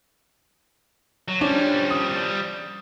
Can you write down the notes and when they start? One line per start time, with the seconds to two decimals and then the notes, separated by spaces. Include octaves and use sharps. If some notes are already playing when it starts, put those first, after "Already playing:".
1.28 F#3
1.41 F3 G3 C#4 D4
1.90 D#6